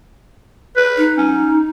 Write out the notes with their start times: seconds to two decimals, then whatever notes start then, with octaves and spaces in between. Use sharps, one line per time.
0.76 B4
0.97 D#4
1.18 C#4